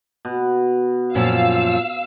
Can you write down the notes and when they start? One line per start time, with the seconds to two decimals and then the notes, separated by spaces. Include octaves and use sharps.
0.25 B2
1.15 F#2 A#2 F3 F5 E6